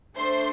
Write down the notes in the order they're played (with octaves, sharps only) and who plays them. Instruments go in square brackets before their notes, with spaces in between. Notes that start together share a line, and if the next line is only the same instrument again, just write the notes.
[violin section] A3 D4 A4 C5 C6